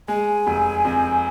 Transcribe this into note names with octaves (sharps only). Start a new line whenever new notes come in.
G#3 G#5
F1
F2